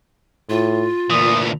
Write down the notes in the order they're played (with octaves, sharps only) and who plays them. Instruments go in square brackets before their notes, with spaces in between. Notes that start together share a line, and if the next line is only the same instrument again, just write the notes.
[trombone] A2 [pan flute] F4
[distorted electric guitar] D2 E3 [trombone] A#2 [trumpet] D#6